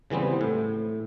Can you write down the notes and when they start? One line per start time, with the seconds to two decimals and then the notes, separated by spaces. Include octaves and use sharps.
0.10 C#3 E3 G3 B3 C4
0.41 A2